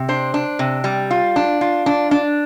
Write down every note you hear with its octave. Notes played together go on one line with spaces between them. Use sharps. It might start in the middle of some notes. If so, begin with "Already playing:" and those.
Already playing: C3
D4 C5
D4
C3
G3
F4
D4
F4
D4
D4